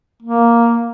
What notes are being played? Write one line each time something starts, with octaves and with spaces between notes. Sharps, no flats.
A#3